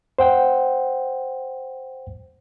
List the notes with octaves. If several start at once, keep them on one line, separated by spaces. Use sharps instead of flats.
C5 F#5 G5